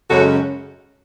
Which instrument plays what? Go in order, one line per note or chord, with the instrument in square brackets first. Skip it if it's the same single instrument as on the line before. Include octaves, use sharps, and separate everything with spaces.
[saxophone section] F#2 C#3 G#3 C#4 F#4 A4